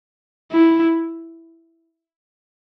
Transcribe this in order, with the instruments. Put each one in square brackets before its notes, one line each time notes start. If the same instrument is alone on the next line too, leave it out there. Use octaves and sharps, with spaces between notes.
[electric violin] E4